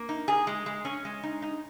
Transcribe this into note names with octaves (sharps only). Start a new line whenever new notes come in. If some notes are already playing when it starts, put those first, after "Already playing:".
Already playing: A#3
D#4
G#4
G#3
G#3
C#4
G#3
D#4
D#4